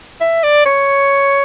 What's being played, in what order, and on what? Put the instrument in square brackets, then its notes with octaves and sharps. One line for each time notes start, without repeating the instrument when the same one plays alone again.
[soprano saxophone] E5
D5
C#5